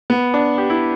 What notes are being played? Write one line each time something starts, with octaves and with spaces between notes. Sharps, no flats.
B3
D4
G4
E4